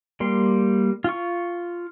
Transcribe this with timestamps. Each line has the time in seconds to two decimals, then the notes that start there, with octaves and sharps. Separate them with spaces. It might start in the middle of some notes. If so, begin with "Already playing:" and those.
0.20 G3 A#3 C6
1.04 F4 C#6